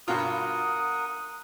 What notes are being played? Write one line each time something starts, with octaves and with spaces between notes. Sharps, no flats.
G2 B2 F4 A#4 F#5 D#6